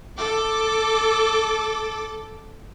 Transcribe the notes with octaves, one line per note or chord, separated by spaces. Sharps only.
A4 D6